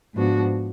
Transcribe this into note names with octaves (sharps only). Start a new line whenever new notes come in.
G#2 F3 B3 D4 F#4